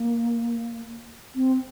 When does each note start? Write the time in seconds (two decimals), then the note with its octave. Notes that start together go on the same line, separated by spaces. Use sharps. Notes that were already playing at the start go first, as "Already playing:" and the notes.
Already playing: A#3
1.35 C4